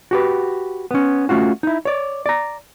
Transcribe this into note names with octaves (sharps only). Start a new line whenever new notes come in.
F#4 G4 B4
B3 C#4
A3 C#4 F4 F#4
D#4 E4
C#5 D5
D5 A#5